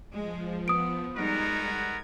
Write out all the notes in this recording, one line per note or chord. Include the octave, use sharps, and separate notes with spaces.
F3 G#3
B3 D#6 D7
G3 G#3 B3 D#4 F#4 A#4 G#6